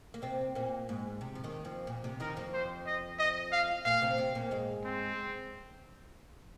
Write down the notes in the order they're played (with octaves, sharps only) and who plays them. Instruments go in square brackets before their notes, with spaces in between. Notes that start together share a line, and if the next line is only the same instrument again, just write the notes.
[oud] A#3
C3 C4
A#2 A#3
G#2
C3
F3
D#2 D#3
F2 F3
A#2
C3
[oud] D#2 D#3 [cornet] A#4
[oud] F2 F3
[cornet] C5
D#5
D#5
F5
[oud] A#2 A#3 [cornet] F5
[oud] C3 C4
C3 C4
A#2 A#3
G#2 G#3
[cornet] C4